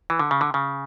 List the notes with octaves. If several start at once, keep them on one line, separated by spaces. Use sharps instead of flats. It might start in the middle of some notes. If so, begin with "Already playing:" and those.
E3
D3
C#3
D3
C#3